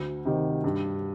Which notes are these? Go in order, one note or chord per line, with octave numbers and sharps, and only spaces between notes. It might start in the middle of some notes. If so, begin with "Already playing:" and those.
Already playing: D2
C3 D#3
G2